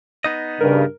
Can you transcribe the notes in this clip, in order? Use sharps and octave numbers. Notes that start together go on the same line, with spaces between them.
B3 D#4 D#5
G2 C#3 A#4